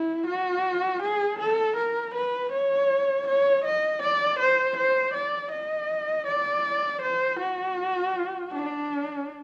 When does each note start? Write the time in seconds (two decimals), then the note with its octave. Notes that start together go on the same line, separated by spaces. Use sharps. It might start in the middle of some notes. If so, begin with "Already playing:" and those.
Already playing: E4
0.27 F#4
1.03 G#4
1.39 A4
1.77 A#4
2.15 B4
2.53 C#5
3.28 C#5
3.65 D#5
4.03 D5
4.40 C5
4.77 C5
5.14 D5
5.52 D#5
6.27 D5
7.02 C5
7.40 F#4
8.52 D4